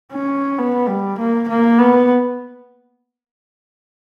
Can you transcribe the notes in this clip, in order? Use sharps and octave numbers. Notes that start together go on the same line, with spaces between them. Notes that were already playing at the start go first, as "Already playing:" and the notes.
C#4
B3
G3
A#3
A#3
B3